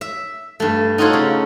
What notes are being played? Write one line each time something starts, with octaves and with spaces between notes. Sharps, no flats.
E5
G2 A3
D#4 F4 F#4 A4 C5 C#5
C#3